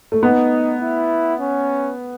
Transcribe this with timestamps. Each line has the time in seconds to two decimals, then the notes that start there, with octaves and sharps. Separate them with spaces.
0.12 A3
0.23 B3 D#4
0.82 E4
1.40 C#4